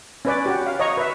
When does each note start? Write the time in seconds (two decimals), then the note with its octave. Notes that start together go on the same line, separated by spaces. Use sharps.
0.25 C#4 B4 D5
0.46 F#4 G4
0.66 F5
0.79 C#5 D#5 A#5 C#6
0.97 B4 E5